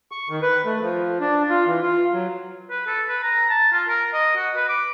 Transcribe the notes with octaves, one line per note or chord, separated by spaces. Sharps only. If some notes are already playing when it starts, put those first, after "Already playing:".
C#6
D#3
B4
A3
F3
D4
F4
E3
F4
F#3
B4
A4
B4
A#5
A5
F4
A#4
D#5
F#4
B4
D6